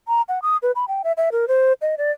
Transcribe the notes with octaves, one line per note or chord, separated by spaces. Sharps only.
A#5
F#5
D#6
B4
B5
G5
E5
E5
A#4
C5
D#5
D5